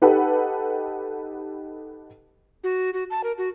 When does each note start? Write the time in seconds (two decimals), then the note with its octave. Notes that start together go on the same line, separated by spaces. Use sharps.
0.02 D#4 G4 A4 B4 F#5
2.64 F#4
2.94 F#4
3.10 A5
3.24 A#4
3.38 F#4